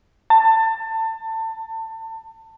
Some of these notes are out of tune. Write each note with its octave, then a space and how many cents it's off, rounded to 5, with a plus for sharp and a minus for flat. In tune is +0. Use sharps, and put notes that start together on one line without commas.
A5 +25